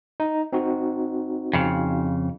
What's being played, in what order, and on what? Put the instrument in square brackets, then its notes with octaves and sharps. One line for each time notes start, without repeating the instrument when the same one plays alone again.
[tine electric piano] D#4
C4 D#4 F#4
[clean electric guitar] F2 C#3